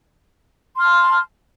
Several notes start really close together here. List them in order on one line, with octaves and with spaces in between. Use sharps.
C6 F6 A5